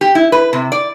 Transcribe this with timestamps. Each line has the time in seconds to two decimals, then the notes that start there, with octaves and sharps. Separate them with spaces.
0.01 G4
0.15 E4
0.32 B4
0.53 C3
0.72 D5